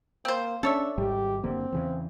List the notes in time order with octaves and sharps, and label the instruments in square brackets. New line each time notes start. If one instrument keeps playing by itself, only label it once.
[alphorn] A#3 [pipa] C4 C5
[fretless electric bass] C#4 [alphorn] D4 [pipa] A4 C#5 E5
[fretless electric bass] G#1 G#2 G3 [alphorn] G4
[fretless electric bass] F#1 D3 A#3 [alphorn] C4
[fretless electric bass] E2 C#3 E3